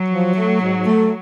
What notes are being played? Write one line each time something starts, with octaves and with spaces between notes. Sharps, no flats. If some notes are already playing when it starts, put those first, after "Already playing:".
Already playing: F#3
F3
A3
G#2
A3